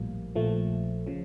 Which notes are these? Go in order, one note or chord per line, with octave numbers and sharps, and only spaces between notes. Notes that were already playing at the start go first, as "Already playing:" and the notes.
Already playing: A#1 A2 F3 G3 A#3
A#1 A#2 F3 A3
C#3 F3